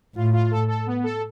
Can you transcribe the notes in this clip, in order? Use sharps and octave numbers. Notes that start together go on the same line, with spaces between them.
A2 F4
F4
A4
A4
B3
A4